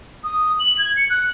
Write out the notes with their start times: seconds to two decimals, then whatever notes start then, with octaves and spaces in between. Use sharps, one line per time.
0.24 D#6
0.60 F#7
0.78 G#6
0.97 C#7
1.10 F#6